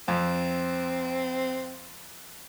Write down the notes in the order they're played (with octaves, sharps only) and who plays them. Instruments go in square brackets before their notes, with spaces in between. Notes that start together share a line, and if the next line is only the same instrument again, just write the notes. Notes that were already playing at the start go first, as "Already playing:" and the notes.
[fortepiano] F2 [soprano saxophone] C4